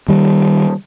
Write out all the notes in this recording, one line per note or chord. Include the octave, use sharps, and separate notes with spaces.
D#3 G3